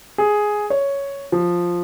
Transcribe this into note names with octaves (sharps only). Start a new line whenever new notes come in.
G#4
C#5
F3